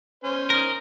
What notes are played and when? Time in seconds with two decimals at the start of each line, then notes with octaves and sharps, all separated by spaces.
0.24 C#4 C5
0.50 D#4 A#4